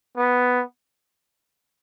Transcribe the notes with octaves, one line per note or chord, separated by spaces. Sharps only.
B3